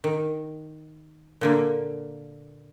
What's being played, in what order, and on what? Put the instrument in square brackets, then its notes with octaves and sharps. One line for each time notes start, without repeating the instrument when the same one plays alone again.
[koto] D#3
A#2 D3 A#3